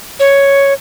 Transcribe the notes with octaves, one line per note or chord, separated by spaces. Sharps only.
C#5